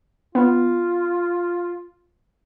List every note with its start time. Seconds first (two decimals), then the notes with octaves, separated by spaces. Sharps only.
0.35 B3 F4